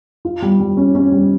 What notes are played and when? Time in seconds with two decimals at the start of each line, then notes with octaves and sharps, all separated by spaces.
0.25 F4
0.42 G3
0.60 G3
0.77 C#4
0.95 C#4
1.12 G3